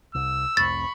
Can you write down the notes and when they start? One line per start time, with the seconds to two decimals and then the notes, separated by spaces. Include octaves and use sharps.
0.15 C2 E6
0.57 F1 C2 B5 C#6 A6